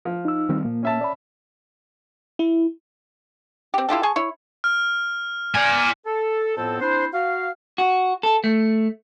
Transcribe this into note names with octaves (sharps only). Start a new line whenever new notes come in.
F3
D#4 E6
D#3 G3 C4
A#2 A#3
C#4 E5 A5
D5 B5
E4
C4 G4
E4 F4 G4 A4
G#4 G#5 A5 C#6
E4 C#5
F6
D5 G#5
A4
F2 A2 B3 C4 A4 A5
C4 D4 E4 C5
F#4 F5
F#4
A4
A3